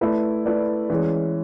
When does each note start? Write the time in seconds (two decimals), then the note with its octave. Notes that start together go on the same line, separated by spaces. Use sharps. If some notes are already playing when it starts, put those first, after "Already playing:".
0.01 A3 E4 B4 D5
0.45 A3 E4 B4 D5
0.90 E3 G#3 C#4